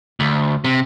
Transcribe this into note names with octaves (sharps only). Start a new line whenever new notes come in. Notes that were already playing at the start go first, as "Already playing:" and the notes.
D2
C3